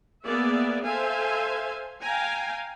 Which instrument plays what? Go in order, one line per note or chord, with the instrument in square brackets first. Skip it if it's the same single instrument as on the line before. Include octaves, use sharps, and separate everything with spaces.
[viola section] A#3 B3 G#4 D5 E5
A4 C5 E5 F5 G#5
F5 G5 G#5 A#5